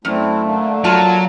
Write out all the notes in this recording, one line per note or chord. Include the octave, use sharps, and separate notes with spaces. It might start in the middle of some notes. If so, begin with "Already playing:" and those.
F#2 A3 C4 D4 E4
D3 A#3 D4
F#3 F4 A5